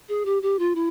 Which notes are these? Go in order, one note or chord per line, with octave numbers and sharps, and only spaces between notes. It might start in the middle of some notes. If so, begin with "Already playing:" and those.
G#4
G4
G4
F4
E4